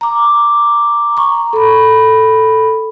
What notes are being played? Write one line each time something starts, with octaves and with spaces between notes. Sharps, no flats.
A#5 D6
A#5 C#6
A4 B5